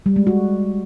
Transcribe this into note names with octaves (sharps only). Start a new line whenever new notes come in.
G3
G#3
F#4